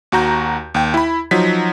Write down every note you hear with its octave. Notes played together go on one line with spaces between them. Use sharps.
D#2 F#4 A#5 G6
D#2 G5
E4 B5
F3 F#3 D#4 B6